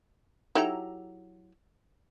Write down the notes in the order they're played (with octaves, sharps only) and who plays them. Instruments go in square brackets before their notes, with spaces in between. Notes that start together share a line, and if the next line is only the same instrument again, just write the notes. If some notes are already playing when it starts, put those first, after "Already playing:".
[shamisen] F#3 E4 G4 [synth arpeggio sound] D#4 A4 A#5